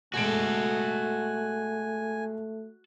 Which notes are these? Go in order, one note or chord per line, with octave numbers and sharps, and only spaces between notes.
B2 G#3 A3 F#4 A4 G#5 D7